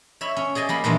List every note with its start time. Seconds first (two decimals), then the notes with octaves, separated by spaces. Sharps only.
0.21 C#5 E5 B5
0.36 C#4
0.55 G#4 D5 D#5 G#5
0.69 G3 A#3 B5
0.84 A#2 D#3 E3 F#3 G#3 D4